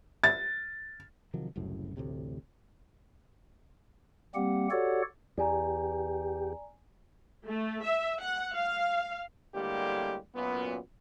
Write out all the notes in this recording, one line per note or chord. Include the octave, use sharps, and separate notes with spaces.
A6
C3 D#3 F3 F#3
F#1 C2 F#2 A2
A1 D2 A2 C3
G3 A#3 C4 G4 F#5
F#4 G4 A4 C#5 D5 F#5
E2 G4 D5 G#5 A#5
A3
E5
F#5
F5
A2 D3 G3 G#3 A#3 G4
F#2 A#2 B3